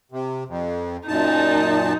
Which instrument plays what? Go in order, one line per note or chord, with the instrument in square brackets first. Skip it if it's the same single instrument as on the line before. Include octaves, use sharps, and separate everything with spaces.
[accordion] C3
F2
[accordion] F#2 A#2 A5 [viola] D#4